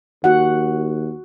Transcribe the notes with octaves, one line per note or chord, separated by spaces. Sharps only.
D#2 F#4 F#5